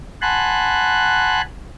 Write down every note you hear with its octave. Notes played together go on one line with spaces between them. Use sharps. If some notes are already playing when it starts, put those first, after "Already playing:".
F#5 G#5 A5 B5 C6 F#6